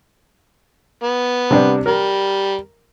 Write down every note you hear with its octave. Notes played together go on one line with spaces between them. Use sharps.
B3
C3 G3 D4
G3 A#4